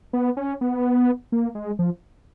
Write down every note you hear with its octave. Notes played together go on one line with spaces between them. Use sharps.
B3
C#4
B3
A#3
G#3
F3